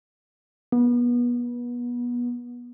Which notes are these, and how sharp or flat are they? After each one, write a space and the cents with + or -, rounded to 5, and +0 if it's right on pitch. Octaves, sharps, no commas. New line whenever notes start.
B3 -30